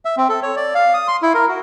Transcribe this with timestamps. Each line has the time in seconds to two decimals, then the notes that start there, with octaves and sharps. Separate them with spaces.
0.05 E5
0.17 C4
0.29 A4
0.43 C#5
0.56 D5
0.75 F5
0.94 D#6
1.08 C6
1.22 E4
1.34 A#4
1.48 F#4